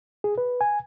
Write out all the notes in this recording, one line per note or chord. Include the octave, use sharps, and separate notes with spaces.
G#4
B4
G#5